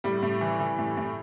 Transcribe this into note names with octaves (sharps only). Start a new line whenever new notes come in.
A2 G3
A2
E3
E3
A2
A2